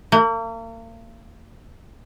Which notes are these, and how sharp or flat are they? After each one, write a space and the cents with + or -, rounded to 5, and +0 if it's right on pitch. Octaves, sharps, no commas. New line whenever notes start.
A#3 -40